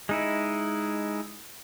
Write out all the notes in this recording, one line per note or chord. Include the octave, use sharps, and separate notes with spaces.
G#3 D#4 E4